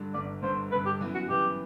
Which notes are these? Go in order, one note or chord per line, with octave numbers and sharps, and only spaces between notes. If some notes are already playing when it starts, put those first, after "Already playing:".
Already playing: G2 D3
G1 G2 D3 D5
G1 G2 D3 C5
G1 G2 D3 B4
G4
F#2 E3 B3
F#4
F#2 E3 B3 G4